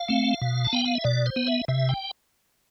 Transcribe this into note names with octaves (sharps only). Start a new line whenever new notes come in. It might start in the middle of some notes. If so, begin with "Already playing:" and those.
Already playing: F5
A3 C4
B2
A5
B3 G5
F5
E5
B2 D5
C5
B3
E5
C3 E5
G5